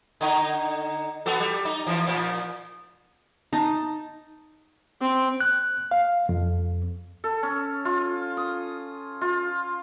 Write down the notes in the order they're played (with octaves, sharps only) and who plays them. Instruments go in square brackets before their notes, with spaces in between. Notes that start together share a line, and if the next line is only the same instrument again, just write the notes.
[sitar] D3 D#4
B3 F#4 A4
G3
D#4
E3 F3
A#2 F3
[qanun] D#4 [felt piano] A5
[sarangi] C4
[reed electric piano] F#6
F5
F2
[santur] A4
C#4
F4
D#6
F4